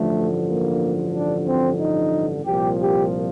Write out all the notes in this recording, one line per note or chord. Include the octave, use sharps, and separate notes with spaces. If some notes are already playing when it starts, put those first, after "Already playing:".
Already playing: A1 G2 D3 F3 A3
A#3
D4
C4
D#4
C2 A#2 F3 G4
G4